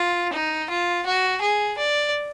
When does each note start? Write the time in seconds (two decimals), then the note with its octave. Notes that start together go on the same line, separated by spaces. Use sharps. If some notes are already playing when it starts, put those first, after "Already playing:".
Already playing: F4
0.33 D#4
0.70 F4
1.06 F#4
1.42 G#4
1.78 D5